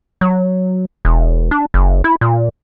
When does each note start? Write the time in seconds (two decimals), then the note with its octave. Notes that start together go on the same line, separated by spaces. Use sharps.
0.21 F#3
1.05 E1
1.51 D4
1.74 F#1
2.04 E4
2.21 A#2